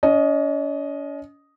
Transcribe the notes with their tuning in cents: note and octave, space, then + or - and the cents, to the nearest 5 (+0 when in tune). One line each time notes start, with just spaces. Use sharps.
C#4 +45 D#5 +0